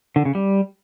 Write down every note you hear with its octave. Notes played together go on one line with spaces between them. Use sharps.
D3
C#3
G3